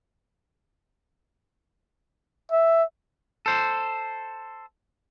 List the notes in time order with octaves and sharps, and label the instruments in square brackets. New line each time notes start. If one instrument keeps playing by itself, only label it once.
[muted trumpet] E5
[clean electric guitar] A4 C5